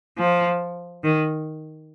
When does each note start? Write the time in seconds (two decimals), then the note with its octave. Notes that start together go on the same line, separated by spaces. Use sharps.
0.18 F3
1.04 D#3